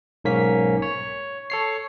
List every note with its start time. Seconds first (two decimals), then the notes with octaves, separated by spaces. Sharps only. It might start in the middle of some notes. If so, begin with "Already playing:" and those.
0.24 B1 G#2 A#3 C#4 B6
0.82 C#5
1.50 A4 C#5 C7